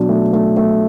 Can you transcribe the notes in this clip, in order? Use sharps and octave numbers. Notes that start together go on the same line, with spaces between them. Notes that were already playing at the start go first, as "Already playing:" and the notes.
Already playing: B2 F#3 D4
A3
A3
A3